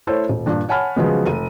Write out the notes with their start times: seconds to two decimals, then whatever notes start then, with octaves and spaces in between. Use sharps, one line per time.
0.07 A3 E4 A4 C5 C#5
0.29 D#1
0.46 G2 A#2 D4
0.69 C#5 F#5 G#5 A5 B5 F6
0.96 C#3 F3 F#3 G#3 B3
1.25 F1 D#7